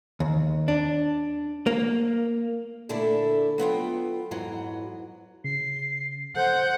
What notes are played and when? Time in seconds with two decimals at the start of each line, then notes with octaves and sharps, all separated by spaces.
0.20 D#2
0.68 D4
1.67 A#3
2.89 A#2 D3 A3 E4 A4 D5
3.58 F#3 B3 F4 G5
4.31 F2 G#2 E3 F#3
5.44 C#3 C7
6.36 A4 C5 F#5 G6